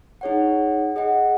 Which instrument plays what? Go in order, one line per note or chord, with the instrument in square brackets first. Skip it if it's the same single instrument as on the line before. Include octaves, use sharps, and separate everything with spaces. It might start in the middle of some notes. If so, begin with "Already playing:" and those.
[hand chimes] D#4 G#4 C#5 F#5
G#4 D#5 F#5